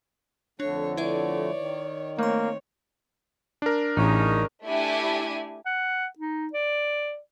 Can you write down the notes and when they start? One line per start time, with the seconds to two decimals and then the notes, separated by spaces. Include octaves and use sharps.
0.60 F2 D3 A3 D4 C#5
0.97 E4 B4 C#5 D5 E5
1.56 D#3
2.19 A3 A#3 C4 C#5 C6
3.62 D4 A#4
3.97 A1 C#3 C#4 D#4
4.65 A3 D4 E4 G4 G#5
5.66 F#5
6.19 D#4
6.53 D5